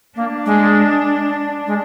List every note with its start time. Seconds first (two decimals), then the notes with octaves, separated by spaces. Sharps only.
0.16 A#3 D4
0.46 G#3
1.67 G#3